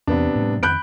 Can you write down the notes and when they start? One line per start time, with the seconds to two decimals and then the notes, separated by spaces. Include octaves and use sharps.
0.07 E2 C3 B3 D4
0.35 A2 G3
0.63 F2 D#3 B5 F#6 G6 D7